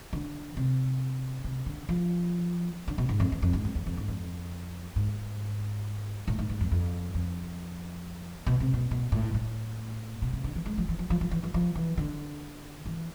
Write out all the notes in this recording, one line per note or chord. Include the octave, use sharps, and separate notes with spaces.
D3
C3
C3
D3
F3
D3
B2
G#2
F2
E2
F2
G#2
F2
E2
F2
G#2
F2
G#2
A2
G#2
G#2
F2
F2
F2
B2
C3
B2
B2
A2
A2
B2
C3
D3
E3
G#3
F3
E3
F3
F3
F3
E3
F3
F3
E3
D3
E3